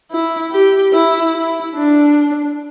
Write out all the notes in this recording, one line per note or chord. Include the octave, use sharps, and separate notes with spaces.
E4
G4
E4
E4
D4